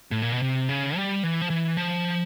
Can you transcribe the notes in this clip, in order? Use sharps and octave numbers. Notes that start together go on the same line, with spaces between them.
A2
A#2
B2
C3
C#3
G3
E3
F3
E3
F3